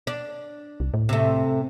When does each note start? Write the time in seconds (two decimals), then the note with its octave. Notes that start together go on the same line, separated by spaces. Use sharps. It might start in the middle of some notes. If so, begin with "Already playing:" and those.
0.07 D4
0.80 C2
0.94 A2
1.09 C3 A3